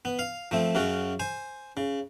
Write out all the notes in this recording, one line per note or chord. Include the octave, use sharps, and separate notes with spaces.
B3
F5
F3 A3 C4
F#2 C#3 C#4 F#4
C5 G#5
C#3